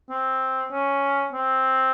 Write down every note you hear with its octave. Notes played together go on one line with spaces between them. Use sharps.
C4
C#4
C4